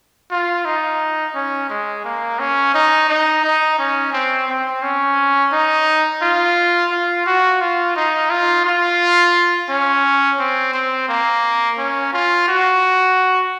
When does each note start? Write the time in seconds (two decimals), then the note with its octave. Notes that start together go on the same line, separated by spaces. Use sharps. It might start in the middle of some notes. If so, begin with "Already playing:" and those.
0.31 F4
0.65 D#4
1.35 C#4
1.70 G#3
2.04 A#3
2.39 C#4
2.74 D#4
3.09 D#4
3.44 D#4
3.78 C#4
4.13 C4
4.48 C4
4.83 C#4
5.52 D#4
6.22 F4
6.91 F4
7.26 F#4
7.61 F4
7.96 D#4
8.30 F4
8.65 F4
9.70 C#4
10.39 C4
10.74 C4
11.09 A#3
11.78 C#4
12.13 F4
12.48 F#4